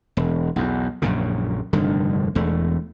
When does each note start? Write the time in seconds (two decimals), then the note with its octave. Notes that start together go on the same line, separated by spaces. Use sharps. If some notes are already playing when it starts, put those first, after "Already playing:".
0.17 E1
0.56 B1 E2
1.02 A#1 F#2 A#2 C#3
1.73 F1 G2 D3 D#3
2.35 E1 E2 A3